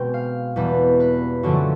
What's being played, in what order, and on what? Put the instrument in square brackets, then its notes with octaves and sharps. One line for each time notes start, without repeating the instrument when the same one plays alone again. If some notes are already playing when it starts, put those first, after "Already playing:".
Already playing: [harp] B2 G#3 C4 G5
F5
E2 B2 G3 B3 B4
B4
F#2 D3 F3 A3 F#4